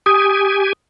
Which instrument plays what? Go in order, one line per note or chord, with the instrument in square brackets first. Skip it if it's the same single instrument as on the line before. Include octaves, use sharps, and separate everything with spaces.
[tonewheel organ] G4 G#5 [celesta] D#6